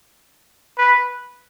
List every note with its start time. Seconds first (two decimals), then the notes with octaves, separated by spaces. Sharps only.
0.78 B4